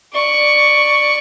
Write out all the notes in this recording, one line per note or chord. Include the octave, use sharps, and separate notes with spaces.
D5 C#6